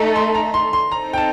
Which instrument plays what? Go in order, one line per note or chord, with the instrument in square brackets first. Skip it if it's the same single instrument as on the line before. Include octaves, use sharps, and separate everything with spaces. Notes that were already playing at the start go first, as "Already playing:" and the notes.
Already playing: [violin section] A3 D#4 A4 [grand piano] A#5
[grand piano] C6
A#5
C6
C6
[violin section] C4 D#4 A4 C5 [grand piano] A#5
[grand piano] G5
A5